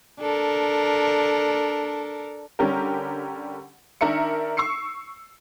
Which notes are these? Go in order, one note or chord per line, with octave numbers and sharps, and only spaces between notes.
D4 A4 A#4
D3 G3 C#4 G4 A#4
D#3 D4 A#4 E5 C#7
C#6 E6 C7 C#7